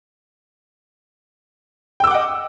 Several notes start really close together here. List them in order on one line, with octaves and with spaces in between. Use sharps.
G5 E6 D6 F#5 D#5